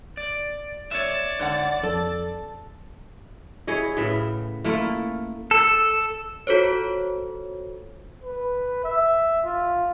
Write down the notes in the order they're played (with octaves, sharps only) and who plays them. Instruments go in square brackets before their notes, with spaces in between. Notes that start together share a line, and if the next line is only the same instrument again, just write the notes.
[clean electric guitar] D5
[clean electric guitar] C#5 E5 [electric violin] D5
[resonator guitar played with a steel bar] G#2 D3 F#5
[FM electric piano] F2 [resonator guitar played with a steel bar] A4
[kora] E4 G#4 C#5 D#5
A2 C#3 B3 E5
A3 A#3 E4 F4
[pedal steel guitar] A4
[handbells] F4 F#4 A4 C5 C#5
[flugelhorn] B4
E5
F4